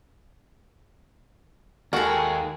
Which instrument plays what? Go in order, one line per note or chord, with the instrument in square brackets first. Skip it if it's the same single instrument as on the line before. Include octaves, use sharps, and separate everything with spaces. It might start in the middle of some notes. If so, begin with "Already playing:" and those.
[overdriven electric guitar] D#2 [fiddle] G#3 [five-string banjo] F#4 A4 A#4 [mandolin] F#5 C#6